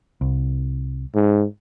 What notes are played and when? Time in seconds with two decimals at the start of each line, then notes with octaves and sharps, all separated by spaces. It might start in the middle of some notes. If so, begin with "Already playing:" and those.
0.21 C2
1.15 G#2